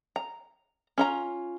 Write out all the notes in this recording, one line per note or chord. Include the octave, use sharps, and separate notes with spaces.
A#5
C#4 F4 A#5